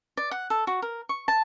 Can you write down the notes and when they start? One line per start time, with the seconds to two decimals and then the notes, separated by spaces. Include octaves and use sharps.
0.17 D5
0.31 F#5
0.50 A4
0.67 F#4
0.82 A#4
1.09 C#6
1.28 A5